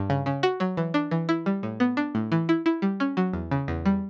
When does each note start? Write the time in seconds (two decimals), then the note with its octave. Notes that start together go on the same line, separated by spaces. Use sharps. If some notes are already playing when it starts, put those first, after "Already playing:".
Already playing: G2
0.10 C#3
0.26 C#3
0.43 F#4
0.60 F#3
0.77 E3
0.94 D4
1.11 E3
1.29 E4
1.46 G3
1.63 A2
1.80 B3
1.97 D4
2.15 A2
2.32 E3
2.49 E4
2.66 E4
2.82 G3
3.00 C#4
3.17 F#3
3.33 E2
3.51 C#3
3.68 E2
3.86 G3